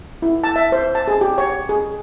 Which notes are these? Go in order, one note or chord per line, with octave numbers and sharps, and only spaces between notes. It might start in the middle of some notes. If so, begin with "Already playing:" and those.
E4
A5
E5
C5
A5
G#4
G4
C#5
G#4